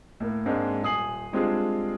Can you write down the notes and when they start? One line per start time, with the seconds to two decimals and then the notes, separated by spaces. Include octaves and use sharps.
0.20 A2 A#3
0.46 G#2 G#3 A#3 C4 D4
0.83 D#1 G#5 D#6 C7 F#7
1.33 G3 G#3 C4 D4 F4 G#4